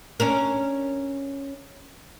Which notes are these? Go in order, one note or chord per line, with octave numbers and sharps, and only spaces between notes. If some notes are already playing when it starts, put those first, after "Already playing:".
C#4 D4 A#4